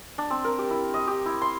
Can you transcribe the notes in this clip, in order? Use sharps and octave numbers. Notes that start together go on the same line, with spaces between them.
D4
C4
A#4
G4
E4
D#5
G4
E4
C6